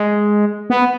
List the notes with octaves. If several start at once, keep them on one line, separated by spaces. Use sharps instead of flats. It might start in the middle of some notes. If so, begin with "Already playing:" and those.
Already playing: G#3
B3